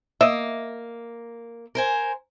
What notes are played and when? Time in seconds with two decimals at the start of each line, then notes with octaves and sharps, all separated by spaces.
0.21 A#3 D#5 E5
1.75 A#4 C5 G#5